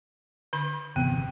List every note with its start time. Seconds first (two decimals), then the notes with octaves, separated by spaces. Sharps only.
0.53 D3 B5
0.96 G1 E2 C3 B3